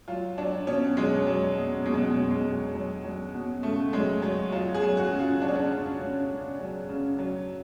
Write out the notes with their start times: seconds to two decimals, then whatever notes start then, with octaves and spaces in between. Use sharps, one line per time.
0.08 F#3 F4
0.38 F#3 D4
0.67 B2 C#4
0.97 F#3 G#3
1.27 F#3
1.56 B2
1.86 B2 G#3
1.94 F#3
2.11 B2 F#3
2.31 G#3
2.45 F#3
2.75 F#3
3.04 F#3
3.34 B2
3.63 C#3 A3
3.93 F#3 G#3
4.22 F#3
4.52 F#3 F4
4.74 G#4
4.82 F#3
4.97 F#4
5.11 C#3
5.19 F4
5.41 F#3 D4
5.48 C#4
5.55 D4
5.71 C#3
6.01 C#3
6.30 C#3
6.59 F#3
6.89 C#3
7.19 F#3